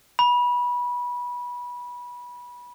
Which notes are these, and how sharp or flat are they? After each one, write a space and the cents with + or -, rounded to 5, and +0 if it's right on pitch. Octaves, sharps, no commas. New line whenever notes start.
B5 -20